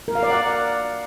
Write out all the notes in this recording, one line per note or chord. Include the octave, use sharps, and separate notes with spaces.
A#4
F5
D5
F#5